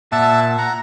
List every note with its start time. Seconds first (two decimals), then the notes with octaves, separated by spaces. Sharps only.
0.12 A#2 E5 F#5 A5
0.58 F#5 A#5